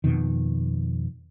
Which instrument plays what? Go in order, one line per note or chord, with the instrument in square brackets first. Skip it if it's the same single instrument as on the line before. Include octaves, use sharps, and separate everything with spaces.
[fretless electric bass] F2 B2 D#3